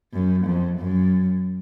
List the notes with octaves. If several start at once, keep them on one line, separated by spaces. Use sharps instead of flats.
F#2
F2
F#2